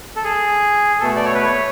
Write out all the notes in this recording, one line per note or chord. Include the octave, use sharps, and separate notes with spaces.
A4
G#4
B2 A3 A4
D5
C#5
B4
C#5